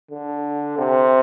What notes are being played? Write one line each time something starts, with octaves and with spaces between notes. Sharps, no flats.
D3
C3